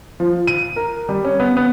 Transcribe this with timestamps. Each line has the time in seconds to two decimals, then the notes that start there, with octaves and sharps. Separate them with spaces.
0.20 F3
0.47 D#7
0.76 A#4
1.09 G3
1.24 C#4
1.40 B3
1.57 B3